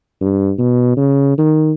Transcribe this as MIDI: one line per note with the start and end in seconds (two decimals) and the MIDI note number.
0.21 0.51 43
0.58 0.94 47
0.97 1.36 49
1.38 1.72 51